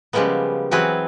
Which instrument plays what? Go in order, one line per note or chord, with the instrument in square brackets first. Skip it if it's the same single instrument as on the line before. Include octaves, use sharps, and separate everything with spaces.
[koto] C#3 F3 G3 G#3 A#3 B3
E3 F#3 C4 F#4 G#4 B4